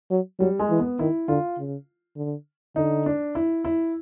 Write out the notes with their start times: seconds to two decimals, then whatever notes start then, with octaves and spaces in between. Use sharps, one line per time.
0.11 F#3
0.39 F#3 G3
0.59 G#3
0.70 E3
0.80 B3
0.99 D#3 E4
1.28 D3 F4
1.58 C#3
2.17 D3
2.76 D3 D#4
3.06 D4
3.35 E4
3.65 E4